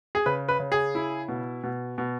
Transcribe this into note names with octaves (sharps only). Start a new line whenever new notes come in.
G#4
C#3 B4
B4
C#3
G#4
E4
B2
B2
B2